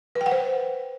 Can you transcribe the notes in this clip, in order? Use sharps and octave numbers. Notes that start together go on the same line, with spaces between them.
B4
G5
F#5
C5